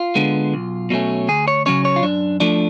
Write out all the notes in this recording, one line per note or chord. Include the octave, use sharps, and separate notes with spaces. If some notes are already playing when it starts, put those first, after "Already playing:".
Already playing: F4
D3 G#3 B3
B1
B2 F#3 A3 C#4
D2 G#4
C#5
C#3 F#3 C#4 C#5
C#5
F4
F#2 D4
F3 A3 D4